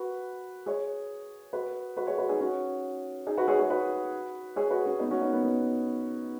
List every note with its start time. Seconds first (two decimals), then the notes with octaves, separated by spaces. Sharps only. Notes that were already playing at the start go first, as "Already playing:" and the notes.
Already playing: F#4 B4
0.66 G#4 C#5
1.53 F#4 B4
1.96 F#4 B4
2.07 G#4 C#5
2.18 F#4 B4
2.29 D#4 G#4
2.40 C#4 F#4
3.27 D#4 G#4
3.37 F#4 B4
3.48 G#4 C#5
3.59 G#4 C#5
3.70 F#4 B4
4.56 G#4 C#5
4.70 F#4 B4
4.85 C#4 F#4
4.99 B3 D#4
5.10 C#4 F#4
5.21 B3 D#4
5.33 B3
5.44 B3